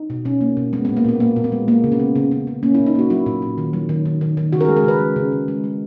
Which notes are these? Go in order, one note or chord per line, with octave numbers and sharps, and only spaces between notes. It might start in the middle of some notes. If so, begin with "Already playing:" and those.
Already playing: D#4
B2
B2 C#4
A#3
B2
G#3 B3
A#2 B3
A#3
A#2 B3
A#2 A#3
A#2
B3
G#3
A#3
C#3
B3
C#3
C#3
C#3
C#3
A#3 C#4
A#2 E4
D#4
A#3 F#4
F#3 E4
A#2
A#2
D#3
F#3
D#3
D#3
D#3
D#3
C#3 F#4
A#4
G#3 G#4
A#4
C#3 B4
G#3
C#3
C#3
G#3
G#3